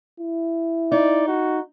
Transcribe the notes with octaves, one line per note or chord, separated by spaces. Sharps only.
E4
D#4 D5
F#4